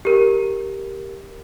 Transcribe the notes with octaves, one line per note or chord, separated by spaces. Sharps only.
G4 A#4